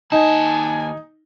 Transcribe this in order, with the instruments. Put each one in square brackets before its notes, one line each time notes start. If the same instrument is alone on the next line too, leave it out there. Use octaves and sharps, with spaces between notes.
[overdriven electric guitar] D#2 A5 [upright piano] D#4 [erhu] G#5